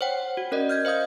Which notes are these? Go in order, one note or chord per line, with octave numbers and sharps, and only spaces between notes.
C5 C#5 F#5 G5
F#4
C#4 A#4 D5 D#5
F6 G6 G#6
C5 D#5 F5 D#6 G6